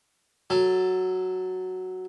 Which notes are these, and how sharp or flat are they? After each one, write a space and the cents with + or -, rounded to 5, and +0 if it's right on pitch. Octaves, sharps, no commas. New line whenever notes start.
F#3 +0 A4 +5